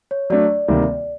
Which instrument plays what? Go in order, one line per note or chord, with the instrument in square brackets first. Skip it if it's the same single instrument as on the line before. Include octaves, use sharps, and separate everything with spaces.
[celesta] C#5
[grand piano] F#3 A3 D4 [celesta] D5
[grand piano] D2 C3 D#3 G3 A#3